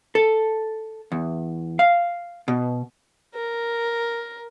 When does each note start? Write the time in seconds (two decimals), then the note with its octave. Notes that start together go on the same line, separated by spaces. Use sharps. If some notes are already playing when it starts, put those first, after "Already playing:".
0.15 A4
1.12 E2
1.79 F5
2.48 B2
3.35 A#4